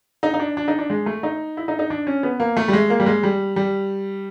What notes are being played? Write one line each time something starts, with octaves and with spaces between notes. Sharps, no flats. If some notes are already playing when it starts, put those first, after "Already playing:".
D#4
D#4
D4
D4
D#4
D4
G#3
A3
D#4
E4
D#4
D#4
D4
C#4
B3
A#3
A3
G3
G#3
A#3
G3
G#3
G3
G3